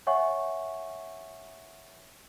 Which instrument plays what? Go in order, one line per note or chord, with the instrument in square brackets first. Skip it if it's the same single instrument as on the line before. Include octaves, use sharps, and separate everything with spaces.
[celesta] C#5 E5 F#5 G#5 C#6